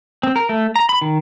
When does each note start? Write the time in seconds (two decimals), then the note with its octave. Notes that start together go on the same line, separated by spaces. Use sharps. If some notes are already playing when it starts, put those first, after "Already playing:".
0.23 C4
0.36 A#4
0.49 A3
0.76 A#5
0.89 B5
1.01 D#3